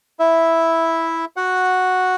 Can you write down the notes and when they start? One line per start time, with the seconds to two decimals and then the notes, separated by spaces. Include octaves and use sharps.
0.19 E4 E5
1.36 F#4 F#5